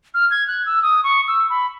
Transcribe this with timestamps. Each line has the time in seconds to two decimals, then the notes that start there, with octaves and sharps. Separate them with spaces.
0.14 F6
0.30 G#6
0.48 F#6
0.66 E6
0.82 D#6
1.04 C#6
1.28 E6
1.50 B5